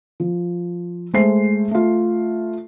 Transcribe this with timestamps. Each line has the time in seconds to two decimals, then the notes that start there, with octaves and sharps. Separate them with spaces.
0.20 F3
1.13 G#3 A3 C5 C7
1.71 A3 F4